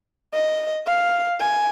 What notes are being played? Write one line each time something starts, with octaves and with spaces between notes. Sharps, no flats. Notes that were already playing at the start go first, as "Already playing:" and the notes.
D#5
F5
G#5